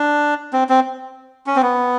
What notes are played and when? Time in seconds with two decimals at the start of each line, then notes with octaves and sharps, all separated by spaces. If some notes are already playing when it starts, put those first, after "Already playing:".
Already playing: D4
0.53 C4
0.69 C4
1.46 C#4
1.56 C4
1.62 B3